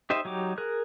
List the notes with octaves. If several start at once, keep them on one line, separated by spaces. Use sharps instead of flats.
D#4 G4 C5 D#5 E5
F#3 D#4 G4 D6
G#4 A#4 F#6